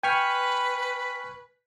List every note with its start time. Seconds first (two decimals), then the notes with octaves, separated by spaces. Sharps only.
0.03 B4 G5 G#5 C#6 F6 B6